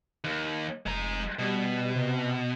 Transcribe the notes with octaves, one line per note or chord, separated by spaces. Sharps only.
D#2
F1 G#3 A#5
B2 G3
C3